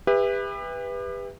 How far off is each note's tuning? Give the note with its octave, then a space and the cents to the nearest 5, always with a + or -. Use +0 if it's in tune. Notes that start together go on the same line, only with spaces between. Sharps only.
G4 +40 B4 +0 E5 +0